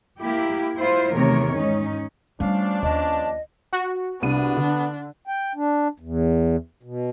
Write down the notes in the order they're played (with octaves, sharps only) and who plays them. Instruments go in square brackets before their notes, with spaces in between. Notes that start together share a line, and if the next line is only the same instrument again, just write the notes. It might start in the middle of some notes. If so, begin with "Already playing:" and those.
[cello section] A#3 E4 G4
E4 F4 C5
E2 C3 D#3 A3 A#4 C#5
G#2 C#4 D#4
[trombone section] F3 C#4 D4 [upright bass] G3 A3 [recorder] F5
[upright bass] D#2 [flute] D#5 [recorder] A5
[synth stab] F#4
[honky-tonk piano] C2 D#7 [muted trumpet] B3 [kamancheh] D4
[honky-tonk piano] D3
[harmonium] G5
D4
E2
B2